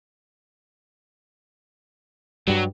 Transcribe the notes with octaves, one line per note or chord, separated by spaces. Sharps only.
G2 F#3 G3